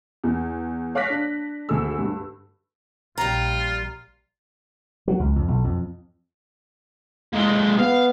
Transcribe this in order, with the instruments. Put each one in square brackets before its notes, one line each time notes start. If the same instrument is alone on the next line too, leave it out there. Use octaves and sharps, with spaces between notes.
[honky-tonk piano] E2
C#5 F5 D6 F#6 A#6 B6
D4
D2 A3 G#4 E6
G2
[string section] A#1 [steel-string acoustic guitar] G3 A#5 [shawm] F4
[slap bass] F#3
C#2
F2
B1
F2
[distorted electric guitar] A#2 G#3
[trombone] B3 [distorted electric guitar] F5